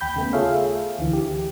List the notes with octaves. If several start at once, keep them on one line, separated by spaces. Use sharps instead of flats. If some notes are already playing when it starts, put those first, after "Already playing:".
D#2 G5 B5 G6
C#3 A3 B3
F4 G#4 A4 C#5 E5 F5
D2 D3 E3
G4